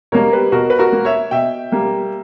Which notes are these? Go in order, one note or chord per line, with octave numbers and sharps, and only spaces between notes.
B2 G3 A#3 A#4 C#5
G4 B4
B2 F#4 A#4
B4
F#4 A#4
A#3
C#5 E5
B2 E5 G5
G3 A#3